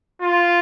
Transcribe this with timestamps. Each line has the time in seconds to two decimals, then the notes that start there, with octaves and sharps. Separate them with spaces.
0.21 F4